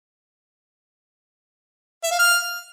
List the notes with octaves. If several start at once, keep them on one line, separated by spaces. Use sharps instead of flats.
E5
F5
F6